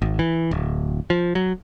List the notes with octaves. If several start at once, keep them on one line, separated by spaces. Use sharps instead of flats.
G#1
E3
D1
F3
F#3